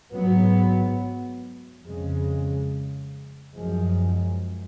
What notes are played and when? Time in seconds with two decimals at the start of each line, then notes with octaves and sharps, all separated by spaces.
0.13 G#2 F#3 B3
1.84 F2 C#3 G#3
3.55 F#2 F3 G#3